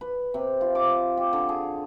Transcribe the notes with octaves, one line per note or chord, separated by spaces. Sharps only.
B4
C3
F4
D6
G4
D3
G#4